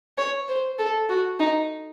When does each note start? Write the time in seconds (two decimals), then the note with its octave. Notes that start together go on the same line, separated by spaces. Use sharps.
0.18 C#5
0.48 C5
0.78 A4
1.09 F#4
1.39 D#4